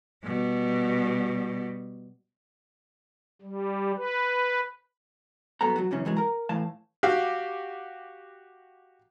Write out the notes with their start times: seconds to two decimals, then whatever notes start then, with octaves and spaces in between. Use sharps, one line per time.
0.24 B2 G3
3.42 G3
3.97 B4
5.61 G2 F#3 B3 A4 A#5
5.76 F#3 F#4
5.91 F#2 C#3 E3 C#4
6.05 G#2 E3 F#3 G#3
6.17 A#4 A#5
6.49 A2 E3 F5 A5
7.03 F#4 G4 F5